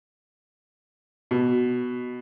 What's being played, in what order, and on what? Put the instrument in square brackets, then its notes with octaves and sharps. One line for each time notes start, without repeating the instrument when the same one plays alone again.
[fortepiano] B2